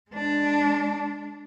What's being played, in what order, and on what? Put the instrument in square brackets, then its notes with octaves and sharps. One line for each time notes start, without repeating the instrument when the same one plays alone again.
[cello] G#3 D4